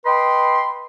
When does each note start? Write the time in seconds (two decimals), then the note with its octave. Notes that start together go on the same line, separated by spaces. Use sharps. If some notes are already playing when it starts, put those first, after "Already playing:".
0.05 B4 D#5 G5 B5 C6